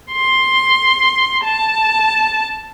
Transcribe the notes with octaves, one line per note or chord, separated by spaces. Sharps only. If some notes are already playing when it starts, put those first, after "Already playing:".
C6
A5